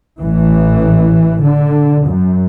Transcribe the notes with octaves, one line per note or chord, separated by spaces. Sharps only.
A1 E3
D3
F#2